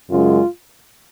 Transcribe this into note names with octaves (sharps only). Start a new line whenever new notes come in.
F#2 C#3 G#3 F4